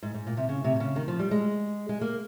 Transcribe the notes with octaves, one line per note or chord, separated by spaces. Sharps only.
G#2
G#2
A#2
C3
C#3
C3
C3
C#3
D#3
F3
G3
G#3
G#3
A#3